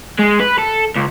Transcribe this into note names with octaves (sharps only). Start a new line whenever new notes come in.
G#3
B4
A4
C#2